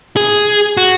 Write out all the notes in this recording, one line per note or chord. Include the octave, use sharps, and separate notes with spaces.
G#4
F#4